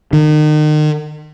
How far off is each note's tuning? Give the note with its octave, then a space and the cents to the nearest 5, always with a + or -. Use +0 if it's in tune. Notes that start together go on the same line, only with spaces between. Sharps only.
D#3 -35